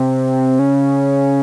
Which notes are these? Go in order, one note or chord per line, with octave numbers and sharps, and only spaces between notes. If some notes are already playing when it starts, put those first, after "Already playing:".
Already playing: C3
C#3